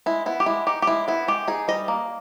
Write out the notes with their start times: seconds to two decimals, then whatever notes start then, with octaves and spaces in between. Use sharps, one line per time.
0.06 G#3 E4
0.26 B3 E4
0.40 G4
0.46 G#3 E4
0.67 D#4 G4
0.82 G4
0.87 G#3 E4
1.08 B3 E4
1.28 G#3 G4
1.48 D#4 G#4
1.68 G3 D#5
1.88 A#3